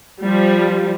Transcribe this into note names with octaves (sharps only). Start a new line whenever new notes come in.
F3 G3